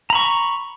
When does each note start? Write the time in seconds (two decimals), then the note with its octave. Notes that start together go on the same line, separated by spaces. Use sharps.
0.10 A#5
0.13 B5
0.15 C#6